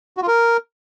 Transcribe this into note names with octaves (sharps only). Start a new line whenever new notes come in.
F#4
F4
A#4